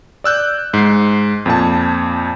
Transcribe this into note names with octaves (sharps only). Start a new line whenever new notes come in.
D5 E6 F#6 G6
G#2 C7
F2 A#2 A5